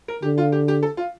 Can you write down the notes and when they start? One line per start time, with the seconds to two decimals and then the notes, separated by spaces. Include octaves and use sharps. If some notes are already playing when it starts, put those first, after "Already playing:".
0.08 A#4
0.22 D3 G4
0.38 F4
0.52 G4
0.68 G4
0.83 A4
0.97 F4